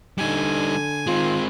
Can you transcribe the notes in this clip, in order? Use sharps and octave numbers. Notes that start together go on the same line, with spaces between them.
D3 G3 D#4 G#5
D#3 G#3 C4 F4